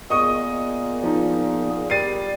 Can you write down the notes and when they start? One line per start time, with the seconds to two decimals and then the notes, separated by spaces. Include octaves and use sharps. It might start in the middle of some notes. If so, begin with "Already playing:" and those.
0.10 A#2 B3 G#4 D#5 C#6 D#6
1.03 F3 D#4
1.90 G3 A6 C7 D#7